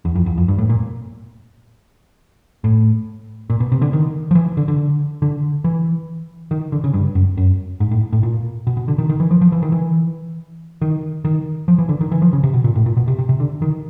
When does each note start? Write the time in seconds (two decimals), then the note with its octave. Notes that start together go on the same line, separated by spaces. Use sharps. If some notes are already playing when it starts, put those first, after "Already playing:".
0.05 E2
0.15 F2
0.26 E2
0.38 F2
0.48 G2
0.58 A2
0.69 A#2
2.64 A2
3.50 A#2
3.60 B2
3.72 C3
3.82 D3
3.93 D#3
4.31 F3
4.35 E3
4.57 D3
4.68 D3
5.22 D3
5.64 E3
6.51 D#3
6.72 D3
6.84 C#3
6.93 G2
7.15 F#2
7.37 F#2
7.80 G#2
7.91 A2
8.13 A2
8.23 A#2
8.67 B2
8.77 B2
8.88 D3
8.98 D#3
9.09 D#3
9.20 E3
9.31 F3
9.41 F3
9.52 E3
9.62 D#3
9.72 E3
10.82 D#3
11.25 D#3
11.68 F3
11.78 E3
11.89 D3
12.01 D#3
12.12 E3
12.22 F3
12.33 C#3
12.43 C3
12.54 B2
12.64 A#2
12.75 A2
12.86 A#2
12.97 B2
13.08 C3
13.19 C3
13.29 C3
13.40 D3
13.62 D#3